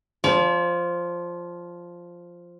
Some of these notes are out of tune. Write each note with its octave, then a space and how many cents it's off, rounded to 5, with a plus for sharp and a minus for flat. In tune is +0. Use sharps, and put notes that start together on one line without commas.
F3 +0 D5 -45